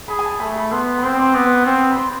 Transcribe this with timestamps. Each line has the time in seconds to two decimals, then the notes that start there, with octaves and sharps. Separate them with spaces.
0.08 G#4 B5
0.19 G#5
0.25 A5
0.40 A3 B5
0.56 B5
0.72 B3 C6
0.98 B5
1.03 C4 C6
1.19 D6
1.34 B3 D6
1.66 C4
1.91 B5
1.97 C6